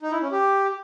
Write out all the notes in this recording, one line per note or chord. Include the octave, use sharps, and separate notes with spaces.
D#4
E4
C#4
G4